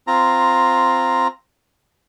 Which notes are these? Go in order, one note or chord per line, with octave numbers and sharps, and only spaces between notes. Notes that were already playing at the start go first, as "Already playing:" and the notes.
C4 F4 A#5